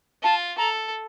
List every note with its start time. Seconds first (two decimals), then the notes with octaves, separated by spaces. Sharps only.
0.23 F4 A5
0.58 A4 A#5